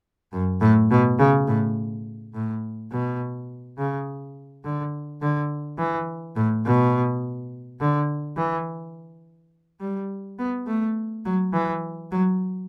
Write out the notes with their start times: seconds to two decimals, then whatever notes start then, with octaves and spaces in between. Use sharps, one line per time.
0.33 F#2
0.61 A2
0.91 B2
1.19 C#3
1.48 A2
2.34 A2
2.92 B2
3.78 C#3
4.64 D3
5.21 D3
5.78 E3
6.36 A2
6.65 B2
7.80 D3
8.37 E3
9.81 G3
10.39 B3
10.67 A3
11.25 F#3
11.53 E3
12.11 F#3